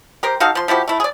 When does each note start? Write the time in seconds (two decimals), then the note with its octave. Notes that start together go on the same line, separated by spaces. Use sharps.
0.23 G4 A#4 C5
0.40 D#4 F#4 A4 F5
0.55 F3 C6
0.68 F3 E4 F#4 G4
0.88 A3 E4
1.00 G#4 D5